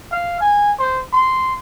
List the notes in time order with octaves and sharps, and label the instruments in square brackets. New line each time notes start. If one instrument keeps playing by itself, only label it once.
[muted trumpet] F5
G#5
C5
C6